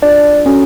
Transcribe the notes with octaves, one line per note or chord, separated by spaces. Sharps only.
D4 F4 G#4 D5
C#4 F#4 A4